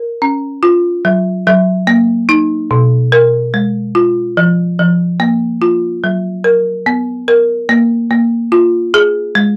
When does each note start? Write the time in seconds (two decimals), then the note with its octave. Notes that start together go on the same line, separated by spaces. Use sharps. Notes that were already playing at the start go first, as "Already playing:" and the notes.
Already playing: A#4
0.22 C#4
0.63 F4
1.05 F#3
1.47 F#3
1.87 A#3
2.29 D#4
2.71 B2
3.12 A#4
3.54 G#3
3.95 F4
4.37 F3
4.79 F3
5.20 A#3
5.62 F4
6.04 F#3
6.44 A#4
6.86 B3
7.28 A#4
7.69 A#3
8.11 A#3
8.52 F4
8.94 G#4
9.35 G#3